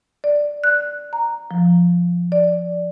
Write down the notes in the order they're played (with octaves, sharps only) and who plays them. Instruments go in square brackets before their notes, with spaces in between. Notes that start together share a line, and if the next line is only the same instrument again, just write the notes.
[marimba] D5
F#6
A#5
F3
D5